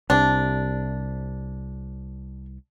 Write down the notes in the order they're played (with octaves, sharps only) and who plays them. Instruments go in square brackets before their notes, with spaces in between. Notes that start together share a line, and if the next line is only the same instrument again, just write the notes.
[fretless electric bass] C2 C3 [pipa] D4